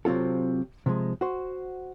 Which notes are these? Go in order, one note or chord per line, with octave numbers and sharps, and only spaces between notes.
C3 F#3 C4 F4 A4
C3 F3 G#3
F#4 C5